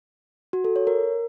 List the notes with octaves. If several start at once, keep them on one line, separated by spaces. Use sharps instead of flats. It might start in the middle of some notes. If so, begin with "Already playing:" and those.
F#4
A4
C#5
A#4